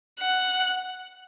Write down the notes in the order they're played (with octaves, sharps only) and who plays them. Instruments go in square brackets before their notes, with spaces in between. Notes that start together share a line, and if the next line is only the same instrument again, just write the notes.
[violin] F#5